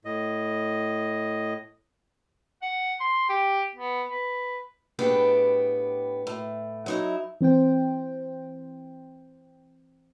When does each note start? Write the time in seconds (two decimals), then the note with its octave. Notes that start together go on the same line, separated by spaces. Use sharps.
0.05 A2 D#5
2.62 F#5
3.00 C6
3.29 G4
3.75 B3
4.10 B4
4.99 A2 B3 D4 G4 G#4 G5
6.27 A2
6.86 F#3 D#4 E4
7.41 E3 C4 C5 G5